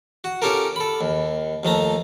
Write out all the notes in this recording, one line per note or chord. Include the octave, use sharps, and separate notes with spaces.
F#4
C#4 F4 G4 A4 A#4
A4 B5
D#2
D#2 F3 A3 A#5